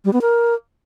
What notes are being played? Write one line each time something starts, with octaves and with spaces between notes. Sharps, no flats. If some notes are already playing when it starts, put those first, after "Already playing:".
G3
B3
A#4